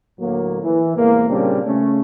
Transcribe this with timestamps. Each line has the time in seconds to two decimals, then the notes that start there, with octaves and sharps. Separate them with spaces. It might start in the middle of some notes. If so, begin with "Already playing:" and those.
0.19 D2 A2 F#3 A#3
0.62 E3
0.96 E2 A2 C3 G#3 A#3
1.28 A#2 C#3 G3 A#3 C4 D4
1.64 C#3 A3 C#4